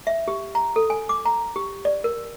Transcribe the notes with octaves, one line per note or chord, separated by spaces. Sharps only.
E5
G4
A#5
A4
G#5
D6
A#5
G4
D5
A#4